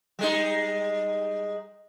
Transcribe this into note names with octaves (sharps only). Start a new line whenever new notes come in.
G3 G#3 D#4